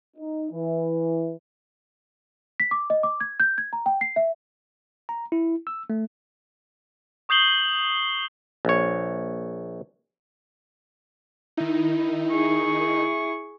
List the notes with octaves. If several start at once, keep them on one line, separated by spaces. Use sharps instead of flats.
D#4
E3
B6
D6
D#5
D6
G#6
G6
G#6
A#5
G5
C7
E5
A#5
E4
E6
A3
C#6 D#6 G6 C7 F#7 G7
A#1 C#5
D#3 D#4 E4
G#4 C#6